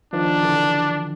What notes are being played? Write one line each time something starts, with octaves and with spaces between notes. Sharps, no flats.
D#3 F3 D4
D3 E3